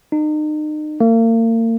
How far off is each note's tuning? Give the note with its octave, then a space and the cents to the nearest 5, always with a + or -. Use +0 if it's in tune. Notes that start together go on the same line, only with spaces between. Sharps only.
D#4 -35
A#3 -40